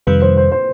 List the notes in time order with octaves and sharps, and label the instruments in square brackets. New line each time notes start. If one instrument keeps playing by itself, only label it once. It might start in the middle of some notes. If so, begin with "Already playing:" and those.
[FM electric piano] F2 C3 D#3 G3 [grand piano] B4
[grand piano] C5
C5
C5